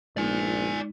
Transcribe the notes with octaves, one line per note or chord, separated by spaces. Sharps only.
A#1 G#3 D#4 D5 G#5